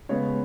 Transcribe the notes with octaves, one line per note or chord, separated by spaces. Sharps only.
C#3 G#3 B3 C#5